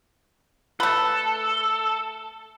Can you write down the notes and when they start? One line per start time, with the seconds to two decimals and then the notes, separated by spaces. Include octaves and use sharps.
0.80 A3 A4 B4